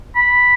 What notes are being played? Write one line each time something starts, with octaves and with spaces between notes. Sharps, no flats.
B5